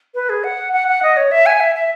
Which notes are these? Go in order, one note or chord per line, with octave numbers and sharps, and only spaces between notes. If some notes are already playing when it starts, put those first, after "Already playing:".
B4
G#4
F#5
F#5
F#5
D#5
C#5
E5
G#5
E5
E5